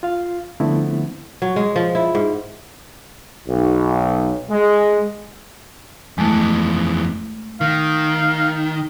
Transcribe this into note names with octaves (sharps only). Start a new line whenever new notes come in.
F4 F5
D3 F3 A3 B3 C4 E4
F#3
G#3
F3
E4
G#2
B1
G#3
F2 E3 G#3 A3
D#3 F5